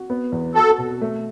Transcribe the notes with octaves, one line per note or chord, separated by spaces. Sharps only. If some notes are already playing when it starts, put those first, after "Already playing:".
Already playing: F#4
B3
E2
F#4 A4
B2
A3